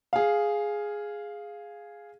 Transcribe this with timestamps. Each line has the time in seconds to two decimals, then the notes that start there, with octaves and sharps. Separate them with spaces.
0.13 G#4 F5